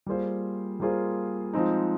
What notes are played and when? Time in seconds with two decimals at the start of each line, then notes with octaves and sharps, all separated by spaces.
0.06 G3 A#3 F4 G#4 C5
0.80 G3 A#3 F4 G#4 C5
1.53 F3 G#3 C4 D#4